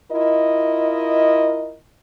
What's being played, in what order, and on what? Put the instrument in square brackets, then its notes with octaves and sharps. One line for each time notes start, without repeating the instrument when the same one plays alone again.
[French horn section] E4 F4 A#4 D#5